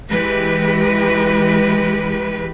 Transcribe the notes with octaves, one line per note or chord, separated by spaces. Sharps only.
E3 G#3 G4 B4